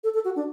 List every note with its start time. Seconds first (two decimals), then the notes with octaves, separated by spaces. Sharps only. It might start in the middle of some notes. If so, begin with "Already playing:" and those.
0.04 A4
0.14 A4
0.25 F#4
0.36 D4